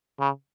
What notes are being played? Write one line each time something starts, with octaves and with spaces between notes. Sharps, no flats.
C#3